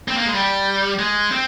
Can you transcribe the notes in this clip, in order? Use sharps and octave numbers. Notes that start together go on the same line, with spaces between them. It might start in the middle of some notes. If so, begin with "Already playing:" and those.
C4
A#3
G#3
G3
G#3
C4